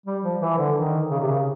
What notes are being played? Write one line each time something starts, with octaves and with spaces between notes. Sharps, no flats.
G3
F3
E3
D3
D#3
C#3
C3
C#3